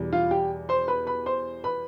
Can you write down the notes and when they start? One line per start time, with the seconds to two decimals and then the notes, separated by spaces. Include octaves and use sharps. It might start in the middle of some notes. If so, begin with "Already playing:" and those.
Already playing: E2 B2 G3
0.13 F4 F5
0.31 G4 G5
0.69 C5 C6
0.88 B4 B5
1.07 B4 B5
1.26 C5 C6
1.64 B4 B5